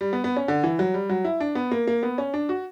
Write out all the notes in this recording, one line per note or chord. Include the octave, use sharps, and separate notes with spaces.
G3
B3
B3
C#4
D3
E3
F#3
G3
F#3
E4
D4
B3
A#3
A#3
B3
C#4
D4
F#4